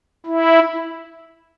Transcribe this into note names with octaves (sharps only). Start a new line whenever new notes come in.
E4